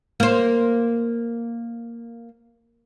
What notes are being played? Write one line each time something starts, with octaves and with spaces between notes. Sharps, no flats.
A#3 C5